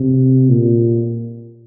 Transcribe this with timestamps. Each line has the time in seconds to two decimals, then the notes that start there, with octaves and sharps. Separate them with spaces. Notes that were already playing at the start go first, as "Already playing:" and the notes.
Already playing: C3
0.49 A#2